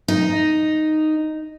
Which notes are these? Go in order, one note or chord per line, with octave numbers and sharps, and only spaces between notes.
D#4